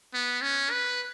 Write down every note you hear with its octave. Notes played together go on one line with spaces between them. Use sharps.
B3
C#4
B4